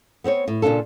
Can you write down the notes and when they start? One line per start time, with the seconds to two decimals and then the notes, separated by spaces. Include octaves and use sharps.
0.24 B3 C4 B4 C#5
0.48 A2
0.62 A#2 C#3 D4 F4 A4